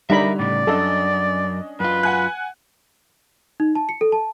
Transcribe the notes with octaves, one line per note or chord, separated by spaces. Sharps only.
D3 G3 D#4 A#4 E5 A#5 B5
A2 C#3 D5
F#2 C#4 D4 A4 D#5
F#2 F4 B4
F#5 G#5 F#6
D#4
A5
C#7
A4
A5